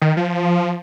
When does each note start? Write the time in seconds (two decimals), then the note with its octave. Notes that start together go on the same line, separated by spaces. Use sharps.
0.01 D#3
0.17 F3